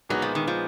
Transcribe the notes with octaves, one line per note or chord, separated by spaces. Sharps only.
A#2 F#3 G#3 B3 D#4
F3
D#3
F3